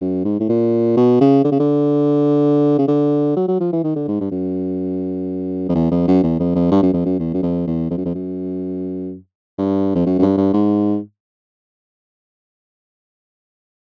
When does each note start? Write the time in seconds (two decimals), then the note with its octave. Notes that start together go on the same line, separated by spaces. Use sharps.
0.01 F#2
0.25 G#2
0.40 A2
0.49 A#2
0.97 B2
1.21 C#3
1.44 D3
1.52 C#3
1.60 D3
2.78 C#3
2.88 D3
3.36 F#3
3.48 F#3
3.60 F3
3.73 E3
3.84 D#3
3.96 D3
4.08 G#2
4.20 G2
4.31 F#2
5.69 F2
5.75 E2
5.91 F2
6.07 F#2
6.23 E2
6.39 F2
6.55 F2
6.71 G2
6.82 F#2
6.93 F2
7.05 F#2
7.19 E2
7.34 F#2
7.43 F2
7.67 E2
7.90 F2
7.98 F#2
8.05 F2
8.15 F#2
9.58 G2
9.95 F2
10.06 F#2
10.19 F#2
10.22 G2
10.38 G2
10.54 G#2